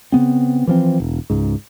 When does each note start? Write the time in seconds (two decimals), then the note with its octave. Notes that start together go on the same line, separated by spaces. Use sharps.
0.12 C#3 B3 C4
0.67 E3 F3 C4
1.00 E1
1.30 C#2 G#2